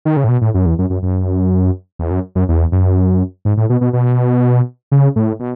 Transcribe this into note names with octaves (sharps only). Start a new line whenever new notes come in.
D#3
C#3
A2
B2
A2
F#2
E2
F#2
F#2
F#2
E2
F#2
F#2
E2
F#2
G#2
A2
B2
B2
B2
C#3
A2
B2